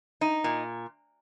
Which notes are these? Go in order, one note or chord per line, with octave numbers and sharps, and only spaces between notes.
D#4
A#2